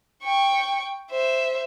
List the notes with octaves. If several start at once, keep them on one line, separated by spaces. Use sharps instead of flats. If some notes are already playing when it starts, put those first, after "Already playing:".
G5 C#6
C5 E5